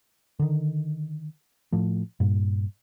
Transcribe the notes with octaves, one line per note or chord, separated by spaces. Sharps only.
D3 D#3
A2 F3 A3
G2 A#2